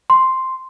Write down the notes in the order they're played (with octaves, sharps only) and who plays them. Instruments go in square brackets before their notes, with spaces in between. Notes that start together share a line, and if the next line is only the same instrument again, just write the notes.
[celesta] C6